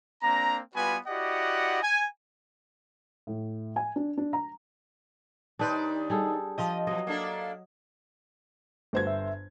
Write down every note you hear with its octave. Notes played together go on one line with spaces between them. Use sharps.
A#3 C4 D4 A#5
G3 B3 F4 F#4 B4 G#5
E4 F#4 G4 D5 D#5 F#5
G#5
A2
G#5
D4
D4
A#5
D#2 D4 D#4 B4 C5 D5
G3 G#4 A4
F3 F4 G4 D#5
B2 F#3 D#5
A#3 D4 A4
G1 A3 F#4 C5 G#6
E5